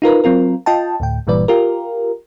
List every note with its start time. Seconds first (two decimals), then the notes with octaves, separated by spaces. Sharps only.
0.02 D#4 F4 A#4 B4
0.24 F#3 C4 F4 A#4
0.66 F4 D#5 G5 A5
1.00 D2 A2 G5
1.27 G1 A#2 E3 G3 B4 D5
1.48 F4 G4 A#4